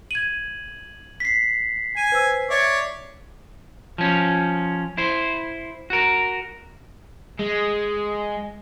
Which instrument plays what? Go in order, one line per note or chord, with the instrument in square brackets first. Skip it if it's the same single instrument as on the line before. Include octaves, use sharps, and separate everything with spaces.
[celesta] G#6 D#7 [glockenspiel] F#7
[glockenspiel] B6 C7
[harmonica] G#5 [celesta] D#7
[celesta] B4 C5 E6
[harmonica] C#5 D5 [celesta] E5
[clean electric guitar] F3 C#4
E4 C5
F#4 A#4
[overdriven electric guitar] G#3